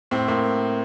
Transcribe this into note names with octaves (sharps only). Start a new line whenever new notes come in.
A2 C4
A2 A#3